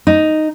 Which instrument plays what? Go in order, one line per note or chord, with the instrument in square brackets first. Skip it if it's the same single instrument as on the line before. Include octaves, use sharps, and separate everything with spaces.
[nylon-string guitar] D#4